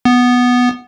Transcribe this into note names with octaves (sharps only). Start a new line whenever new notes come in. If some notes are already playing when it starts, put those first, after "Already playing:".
B3